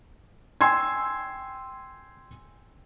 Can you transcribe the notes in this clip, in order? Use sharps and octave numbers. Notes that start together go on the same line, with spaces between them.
G5 G#5 C6 E6 G#6